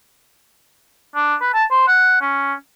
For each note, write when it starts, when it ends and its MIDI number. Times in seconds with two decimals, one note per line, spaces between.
1.15 1.35 62
1.41 1.52 71
1.54 1.64 81
1.71 1.84 72
1.88 2.19 78
2.21 2.53 61